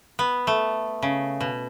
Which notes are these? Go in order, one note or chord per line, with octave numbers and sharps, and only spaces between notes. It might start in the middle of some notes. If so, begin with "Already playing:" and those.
B3
A3
C#3
B2